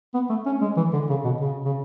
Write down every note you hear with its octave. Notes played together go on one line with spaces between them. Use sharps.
B3
A3
C#4
G#3
E3
D3
C#3
B2
C#3
C#3